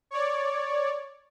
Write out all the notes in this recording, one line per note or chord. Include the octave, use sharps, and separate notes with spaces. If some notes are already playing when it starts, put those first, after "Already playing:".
C#5 D5